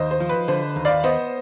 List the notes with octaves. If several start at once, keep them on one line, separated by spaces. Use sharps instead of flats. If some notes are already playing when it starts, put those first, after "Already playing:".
Already playing: D#2 C5 D#5
C5
F3
B4
D3 C5
D#2
D5 F5
B3 C5 D#5